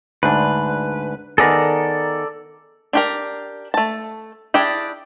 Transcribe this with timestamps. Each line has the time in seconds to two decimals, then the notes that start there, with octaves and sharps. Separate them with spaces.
0.23 D2 G#2 D4 B4
1.38 D#3 B3 G#4 A4 D5 A#5
2.93 D4 G4 A#4
3.74 A3 A5
4.54 D4 E4 G4 G#4